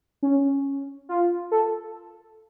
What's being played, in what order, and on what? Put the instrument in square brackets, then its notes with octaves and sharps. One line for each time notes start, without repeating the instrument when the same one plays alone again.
[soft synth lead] C#4
F4
A4